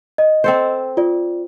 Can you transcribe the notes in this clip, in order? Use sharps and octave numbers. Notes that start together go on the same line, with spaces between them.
D#5
C4 A4 C5
F4 D5